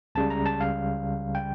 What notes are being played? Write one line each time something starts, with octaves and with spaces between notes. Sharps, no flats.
C#2 C#3 G3 A5
A#5
A5
F5
G5